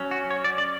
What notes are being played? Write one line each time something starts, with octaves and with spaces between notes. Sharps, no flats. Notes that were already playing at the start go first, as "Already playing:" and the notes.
Already playing: F#3 C#4
F#4
C#5
D5
D5